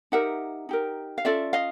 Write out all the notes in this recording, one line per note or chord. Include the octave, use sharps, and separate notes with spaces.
D#4 G4 A#4 E5 F#5
D#4 G4 A#4
F5
C#4 F4 A4 D5 E5
D#5 F5